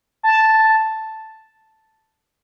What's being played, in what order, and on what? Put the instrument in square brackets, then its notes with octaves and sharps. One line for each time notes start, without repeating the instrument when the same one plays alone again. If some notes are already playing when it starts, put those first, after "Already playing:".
[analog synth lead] A5